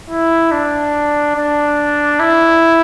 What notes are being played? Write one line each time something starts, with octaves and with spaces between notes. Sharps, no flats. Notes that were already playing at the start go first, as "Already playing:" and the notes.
E4
D4
D4
E4